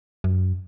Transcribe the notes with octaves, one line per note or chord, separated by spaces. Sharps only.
F#2